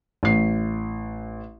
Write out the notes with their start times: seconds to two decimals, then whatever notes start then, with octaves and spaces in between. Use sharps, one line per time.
0.23 A1 C7